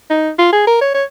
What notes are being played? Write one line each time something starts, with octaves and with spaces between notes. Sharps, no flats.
D#4
F4
G#4
A#4
C#5
C#5